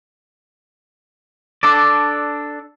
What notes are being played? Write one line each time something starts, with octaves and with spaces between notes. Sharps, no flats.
D4 A4 D5